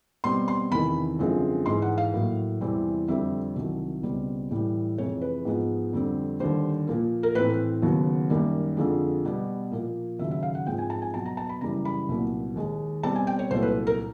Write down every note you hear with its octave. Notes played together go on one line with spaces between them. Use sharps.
B2 G3 C4 C6
C6
E2 C3 D#3 B5
F#2 D3 F3 G#3 C4
G#2 E3 G#3 C6
F#5
F5
A2 F#3 A#3
E2 C3 E3 G3 C4
F2 D3 G3 C4 E5
C2 C3 D#3 F#3
C#2 B2 G3 C4
A2 E3 G3
F2 C3 E3 G#3 C#5
B4
G#2 F3 G#3 B3
F2 D3 G3 C4
D#2 D3 G3 C5
A#2 F3 A#3
A#4
A2 E3 A3 C4 B4
D#2 C#3 F#3 B3
F#2 D#3 G3 A#3
F2 D3 F3 G#3
B2 G3 B3
A#2 F3 A#3
D#2 C#3 F#3 E5
E5
F5
F#5
G#2 F3 G#3 C4 G5
G#5
A5
G#5
B2 F#3 B3 A5
A#5
A5
B5
F#2 C#3 E3 G3 A#5
B5
C2 A#2 F#3 B3
D#2 D#3 G#3
B2 G3 C4 A5
G#5
G5
C#5
C2 A#2 F#3 A3 C5
B4
A#4